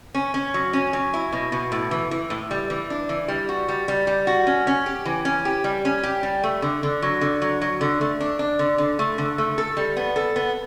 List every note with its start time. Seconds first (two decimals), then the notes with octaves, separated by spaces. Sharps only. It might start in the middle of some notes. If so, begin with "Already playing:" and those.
0.15 C#4
0.34 C#4
0.54 F#3
0.73 C#4
0.93 F#3
1.14 E4
1.33 B2
1.52 B2
1.72 A2
1.91 E3
2.11 E3
2.30 A2
2.51 G3
2.70 E3
2.90 D4
3.09 E3
3.28 G3
3.49 F#4
3.69 G3
3.88 G3
4.07 G3
4.27 F#4
4.47 C#4
4.67 C#4
4.86 G4
5.05 E3
5.25 C#4
5.45 G4
5.64 G3
5.85 C#4
6.03 G4
6.23 G3
6.44 A3
6.62 D3
6.83 D3
7.02 F#3
7.21 D3
7.42 F#3
7.61 F#3
7.81 D3
8.01 A3
8.20 D4
8.39 D4
8.59 D3
8.78 D3
8.99 A3
9.18 D3
9.38 A3
9.58 A4
9.77 G3
9.97 B3
10.16 A4
10.36 B3